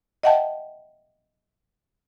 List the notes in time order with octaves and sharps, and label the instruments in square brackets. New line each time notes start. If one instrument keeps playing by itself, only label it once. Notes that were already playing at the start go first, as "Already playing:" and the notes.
[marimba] D#5 E5 F#5 G5 A5